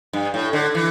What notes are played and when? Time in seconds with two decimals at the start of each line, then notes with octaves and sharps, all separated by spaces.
0.13 G2
0.34 A2
0.53 D3
0.75 E3